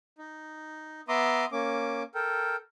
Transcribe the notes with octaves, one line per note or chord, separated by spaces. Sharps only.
D#4
B3 E5 A#5 C6 D6 D#6
A#3 C#4 D6
A4 A#4 G5